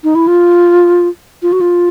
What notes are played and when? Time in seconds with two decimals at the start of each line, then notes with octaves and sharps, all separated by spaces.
0.04 D#4
0.15 E4
0.27 F4
1.42 F4
1.52 F#4
1.61 F4